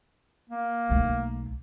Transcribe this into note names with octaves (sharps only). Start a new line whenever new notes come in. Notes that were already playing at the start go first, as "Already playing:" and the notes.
A#3
B1 A3